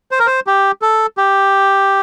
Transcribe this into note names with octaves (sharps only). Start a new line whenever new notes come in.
C5
A#4
C5
G4
A4
G4